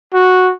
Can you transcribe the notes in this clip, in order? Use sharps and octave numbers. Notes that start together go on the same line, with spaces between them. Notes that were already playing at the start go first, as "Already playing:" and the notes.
F#4